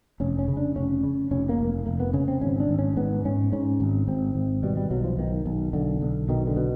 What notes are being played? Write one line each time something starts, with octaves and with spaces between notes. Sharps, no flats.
F1 C#4
C#4
C#3
D4
F1 C#4
C#3
F1 C#4
A#3
F1
F1 A#3
B3
C#3 C#4
C4
G#1 C#4
D4
G#1
C#4
G#2 B3
G#2 C#4
G#2 C#4
G#1
G#1 C4
G#1
B2 G3
G3
B1 F#3
F3
B1 D#3
B1
B1 D3
B1
B2 D#3
D3
B2